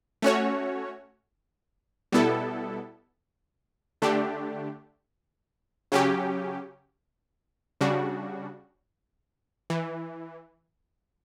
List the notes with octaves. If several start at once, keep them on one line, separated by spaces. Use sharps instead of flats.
A3 C#4 F#4 C#5
B2 G3 B3 E4 A4
D3 A3 D4 G4
C#3 F#3 C#4 G4
C#3 G3 D4 F#4
E3